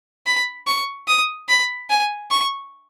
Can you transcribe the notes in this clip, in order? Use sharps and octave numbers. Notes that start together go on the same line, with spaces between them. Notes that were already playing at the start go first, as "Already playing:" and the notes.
B5
C#6
D#6
B5
G#5
C#6